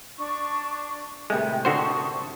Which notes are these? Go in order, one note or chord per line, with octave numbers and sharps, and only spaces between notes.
D4 C#6
A2 C3 D#3 G#3 B4
D3 D#4 F#4 C5 A5 C#6